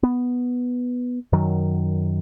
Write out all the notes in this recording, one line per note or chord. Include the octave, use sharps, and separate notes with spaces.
B3
F#2 D#3 F#3